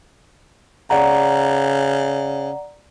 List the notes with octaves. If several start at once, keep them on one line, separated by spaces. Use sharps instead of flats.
C#3 D5 F#5 A#5